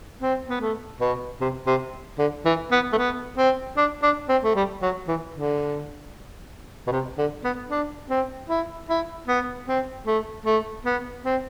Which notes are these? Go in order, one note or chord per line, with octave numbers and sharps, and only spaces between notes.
C4
B3
A3
B2
C3
C3
D3
E3
B3
A3
B3
C4
D4
D4
C4
A3
G3
F#3
E3
D3
B2
C3
D3
B3
D4
C4
E4
E4
B3
C4
A3
A3
B3
C4